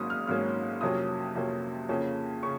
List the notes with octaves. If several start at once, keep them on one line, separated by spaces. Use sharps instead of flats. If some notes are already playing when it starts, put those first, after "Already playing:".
Already playing: G#1 G#2 F#3 A#3 C#4 D#6
F6
G#1 G#2 F#3 A#3 C#4 F6
F2 C3 F#3 A#3 C#4 D#6
F2 C3 F#3 A#3 C#4
F2 C#3 F3 A#3 C#4
C#3 C#6